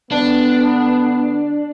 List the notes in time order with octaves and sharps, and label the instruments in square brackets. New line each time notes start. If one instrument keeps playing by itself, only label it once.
[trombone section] D3 B3 [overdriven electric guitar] D4